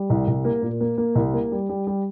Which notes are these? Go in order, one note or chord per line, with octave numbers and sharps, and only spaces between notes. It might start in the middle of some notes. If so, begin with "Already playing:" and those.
Already playing: G3
C2
C2
A#3
A#2
A#3
A#3
C2
A#3
G3
G3
G3